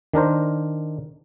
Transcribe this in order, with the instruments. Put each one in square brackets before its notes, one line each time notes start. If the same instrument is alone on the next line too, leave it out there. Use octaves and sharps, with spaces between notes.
[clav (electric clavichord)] D#3 D4 A#4 C5